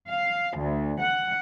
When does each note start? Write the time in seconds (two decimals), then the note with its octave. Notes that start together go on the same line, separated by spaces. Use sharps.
0.10 F5
0.57 D2
1.01 F#5